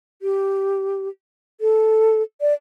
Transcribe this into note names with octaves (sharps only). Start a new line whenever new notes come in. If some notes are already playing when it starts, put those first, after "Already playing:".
G4
A4
D5